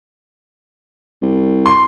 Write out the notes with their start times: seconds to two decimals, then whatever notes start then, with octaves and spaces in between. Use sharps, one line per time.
1.22 C2
1.66 C6